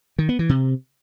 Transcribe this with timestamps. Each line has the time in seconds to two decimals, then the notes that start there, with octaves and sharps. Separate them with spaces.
0.19 D#3
0.29 B3
0.39 E3
0.49 C3